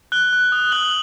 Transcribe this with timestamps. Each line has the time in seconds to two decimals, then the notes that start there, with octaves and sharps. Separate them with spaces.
0.12 F#6 G7
0.33 F#6
0.52 D#6
0.72 F#6 F#7